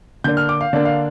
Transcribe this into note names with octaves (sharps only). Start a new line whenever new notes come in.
D3 A#3 D4 G6
F6
D6
F5
D3 A#3 D4 D5
F5